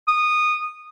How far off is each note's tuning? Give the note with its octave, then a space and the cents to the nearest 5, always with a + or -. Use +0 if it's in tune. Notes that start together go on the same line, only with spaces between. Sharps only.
D#6 -15